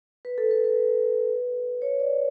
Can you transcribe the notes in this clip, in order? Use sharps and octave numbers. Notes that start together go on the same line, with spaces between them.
B4
A4
B4
B4
C#5
D5